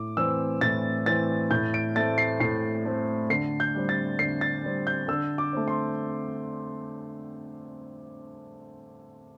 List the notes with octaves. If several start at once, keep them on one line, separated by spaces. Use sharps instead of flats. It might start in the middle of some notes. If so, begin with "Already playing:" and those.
Already playing: A2 D6
E3 C4 E6
A2 A6
E3 C4 A6
A2 G6
D7
A3 C4 A6
C7
A2 C7
A3 C4
D3 C7
G6
G3 C4
A6
D3 C7
A6
G3 C4
G6
D3 E6
D6
A3 C4
C6